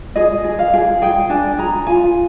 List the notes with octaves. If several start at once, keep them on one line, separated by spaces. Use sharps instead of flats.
G#4 D#5
G#4
F5
G#4
G#4 G5
D4 G#5
G#4 A#5
F4 G#5